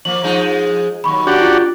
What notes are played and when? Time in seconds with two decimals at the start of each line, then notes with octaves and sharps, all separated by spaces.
0.05 F3 A#3 F#7
0.23 F3 G#3 D#4
1.04 D#2 F#3 B5 C#6
1.27 D4 F#4 G4
1.41 F4 A6